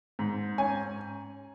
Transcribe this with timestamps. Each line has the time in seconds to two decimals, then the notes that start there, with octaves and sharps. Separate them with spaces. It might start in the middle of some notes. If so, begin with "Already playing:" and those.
0.19 G#2
0.58 C#4 G#5